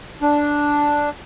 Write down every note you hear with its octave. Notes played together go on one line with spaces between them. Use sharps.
D4